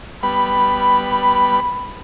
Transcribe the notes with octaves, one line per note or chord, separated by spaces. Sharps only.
G3 B3 B4 B5